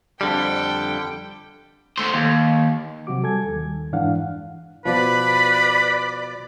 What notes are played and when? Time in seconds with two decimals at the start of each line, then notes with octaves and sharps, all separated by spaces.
0.21 F2 D3 G3 A4 G5
1.98 A3 C5
2.14 D#2
3.07 C3 F#3 F#4 D6
3.23 G3 A4 G#5 G#6
3.44 D#2 D#3
3.92 F2 G#2 E3 D4 F5 F#5
4.85 B2 F3 B4 D5